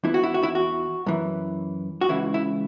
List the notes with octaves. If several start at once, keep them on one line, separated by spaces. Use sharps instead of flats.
E2 E3 E4
F#4
E4
F#4
E4
F#4
F#2 E3
F#4
C#2 C#3 E3 E4
E4